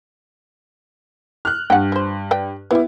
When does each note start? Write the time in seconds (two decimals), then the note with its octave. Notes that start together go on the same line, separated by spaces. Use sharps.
1.45 F6 F#6
1.70 G2 F#5 G5
1.92 F3 C5
2.31 B4 D5 G5
2.71 F#3 G3 B3 E4